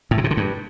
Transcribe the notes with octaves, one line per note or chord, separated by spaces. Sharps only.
A2
C3
B2
D3
G2